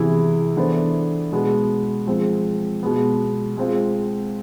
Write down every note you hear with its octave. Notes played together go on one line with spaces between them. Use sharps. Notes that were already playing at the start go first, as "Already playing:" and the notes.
Already playing: C3 E3 B3 E4 G#4
E3 B3 D4 A4 C5
B2 G#3 B3
F3 G#3 C4
B2 G#3 B3
G#3 C4 F4